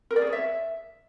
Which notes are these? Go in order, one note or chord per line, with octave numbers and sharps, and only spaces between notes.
A#4
D5
G#4
C#5
E5